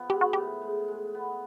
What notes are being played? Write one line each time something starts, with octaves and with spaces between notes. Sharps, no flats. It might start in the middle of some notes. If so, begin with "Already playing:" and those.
Already playing: F3 B3
G#3 G4
F#4
A2 G4
G#3
G#3
B3